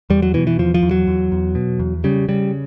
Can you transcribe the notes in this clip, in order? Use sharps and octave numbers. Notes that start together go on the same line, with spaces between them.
E2 G3
F#3
B2 E3
E3
E2 F3
F3
E2
F#3
E2
E2
B2
E2
C#3 G3
C#3 G3